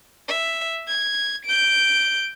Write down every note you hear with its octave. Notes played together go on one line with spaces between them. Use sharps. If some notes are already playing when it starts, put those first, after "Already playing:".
E5
G#6
G6 D7